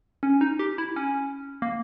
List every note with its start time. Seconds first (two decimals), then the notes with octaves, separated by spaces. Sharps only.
0.23 C#4
0.41 D#4
0.59 G4
0.78 E4
0.96 C#4
1.62 A#3